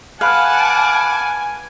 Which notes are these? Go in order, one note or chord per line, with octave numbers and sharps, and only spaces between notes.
B4 F5 F#5 G#5 A5 B5 D6 F6